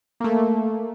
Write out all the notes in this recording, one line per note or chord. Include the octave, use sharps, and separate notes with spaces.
A3 A#3